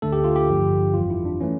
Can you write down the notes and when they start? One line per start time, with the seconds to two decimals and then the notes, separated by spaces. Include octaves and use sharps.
0.02 D2 D3 A3 A4
0.12 G4
0.24 F4
0.36 G4
0.48 A1 G2 D3 F3
0.94 G1 F2 E3 G3 F4
1.10 E4
1.25 D4
1.41 E3 A3 C#4